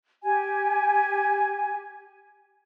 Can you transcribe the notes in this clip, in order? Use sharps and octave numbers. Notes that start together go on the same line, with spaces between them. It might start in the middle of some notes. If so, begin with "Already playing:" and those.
G4 G#5